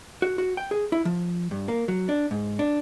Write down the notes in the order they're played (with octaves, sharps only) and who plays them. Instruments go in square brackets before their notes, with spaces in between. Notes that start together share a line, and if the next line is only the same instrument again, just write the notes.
[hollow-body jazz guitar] F#4
F#4
G5
G#4
E4
F3
G2
A#3
F#3
D4
G#2
D4